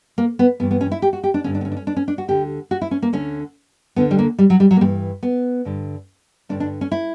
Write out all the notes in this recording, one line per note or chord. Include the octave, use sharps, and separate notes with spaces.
A#3
B3
G2 E3 B3
B3
C#4
E4
G4
F#4
G4
D4
G2 D3 C#4
D4
B3
C#4
D4
C#4
D4
C#4
D4
F#4
D2 D3 G4
F#4
E4
C#4
A#3
D2 D3 C#4
D2 D3 B3
G3
A#3
G3
F#3
G3
F#3
A#3
G2 E3 G3
B3
G2 D3
G2 D3 D4
D4
C#4
E4